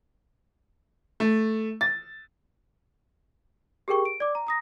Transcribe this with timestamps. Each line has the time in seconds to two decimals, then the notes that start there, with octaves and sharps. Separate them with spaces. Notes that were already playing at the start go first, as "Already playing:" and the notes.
1.20 A3
1.81 A6
3.88 G4 G#4 A#4 G5 C#6
4.05 D7
4.20 D5 D6
4.35 A#5
4.47 A#5 D#6 A#6